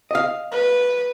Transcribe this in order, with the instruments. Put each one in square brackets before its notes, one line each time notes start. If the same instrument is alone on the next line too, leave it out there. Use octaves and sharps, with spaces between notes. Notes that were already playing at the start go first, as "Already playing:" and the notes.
[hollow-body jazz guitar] D#5 F5
[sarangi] B4